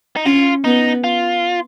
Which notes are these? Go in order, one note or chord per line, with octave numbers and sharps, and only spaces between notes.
D#4
C#4 F4
B3 D#4
F4